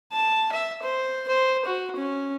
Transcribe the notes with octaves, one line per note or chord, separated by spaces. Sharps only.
A5
E5
C5
C5
F#4
C#4